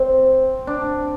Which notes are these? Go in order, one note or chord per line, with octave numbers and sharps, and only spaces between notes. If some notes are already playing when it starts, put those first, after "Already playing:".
Already playing: C4
D4